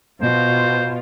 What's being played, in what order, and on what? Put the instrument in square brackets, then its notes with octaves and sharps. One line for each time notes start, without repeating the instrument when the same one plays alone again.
[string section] B2 F4 [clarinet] C5